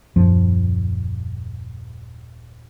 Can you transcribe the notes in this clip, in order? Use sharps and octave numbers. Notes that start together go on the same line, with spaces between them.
D#1 F#2 F3